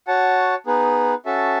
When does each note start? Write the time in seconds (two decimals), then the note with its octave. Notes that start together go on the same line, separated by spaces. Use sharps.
0.07 F#4 C#5 F#5 A5
0.67 B3 D#4 G#4 B4
1.25 C#4 F#4 A4 E5 A5